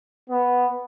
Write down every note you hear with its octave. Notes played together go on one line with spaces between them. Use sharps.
B3